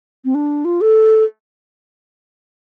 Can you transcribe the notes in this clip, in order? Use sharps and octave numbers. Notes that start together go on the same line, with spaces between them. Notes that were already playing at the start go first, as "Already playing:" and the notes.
C4
D4
F4
A4